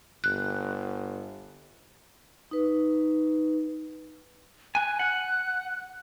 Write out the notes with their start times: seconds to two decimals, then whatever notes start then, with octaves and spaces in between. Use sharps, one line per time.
0.24 G1 F#6
2.51 D#4 B4
4.75 G#5 F#6
4.99 F#5